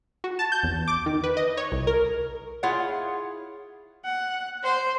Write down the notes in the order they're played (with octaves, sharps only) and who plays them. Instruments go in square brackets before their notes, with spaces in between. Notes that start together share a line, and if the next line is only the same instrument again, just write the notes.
[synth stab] F#4
A5
G6
E2
D6
D#3
B4
D#5
C#5
C2
A#4
[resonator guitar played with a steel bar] E4 F4 G#4 C#5 F#5
[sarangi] F#5
C5